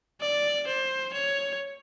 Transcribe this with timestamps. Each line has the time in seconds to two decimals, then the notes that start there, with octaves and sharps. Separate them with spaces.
0.21 D5
0.67 C5
1.13 C#5